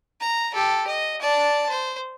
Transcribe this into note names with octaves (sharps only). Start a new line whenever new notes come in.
A#5
G4 A4
D#5
D5 A5
C5